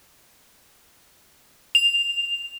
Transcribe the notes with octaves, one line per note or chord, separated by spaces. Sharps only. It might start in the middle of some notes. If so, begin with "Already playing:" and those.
F7